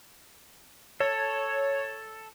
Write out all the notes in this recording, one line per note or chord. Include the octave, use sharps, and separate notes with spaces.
A4 C#5